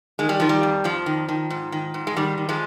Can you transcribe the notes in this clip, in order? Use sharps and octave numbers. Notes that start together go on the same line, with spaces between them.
D#3 G#3
G3
D#3 F3
G3
F2
F2 F3
D#3
D#3
G#2
D#3
G#2
G#3
D#3 G3
D#3
F3 G#3